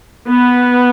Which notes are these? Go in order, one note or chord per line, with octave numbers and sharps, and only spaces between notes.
B3